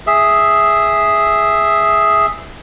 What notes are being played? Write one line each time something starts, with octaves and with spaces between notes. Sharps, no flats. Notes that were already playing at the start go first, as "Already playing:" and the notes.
G#4 E5